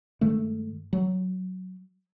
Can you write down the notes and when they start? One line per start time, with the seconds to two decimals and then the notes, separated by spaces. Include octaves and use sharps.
0.21 G2 D#3 G#3 A3
0.93 F#3